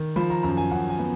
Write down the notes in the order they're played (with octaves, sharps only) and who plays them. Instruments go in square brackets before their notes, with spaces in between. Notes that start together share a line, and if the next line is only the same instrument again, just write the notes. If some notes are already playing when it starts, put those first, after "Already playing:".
Already playing: [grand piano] D#3
F3 B5
A#5
F#2 A#5
G#5
F#2 F#5
G#5
B3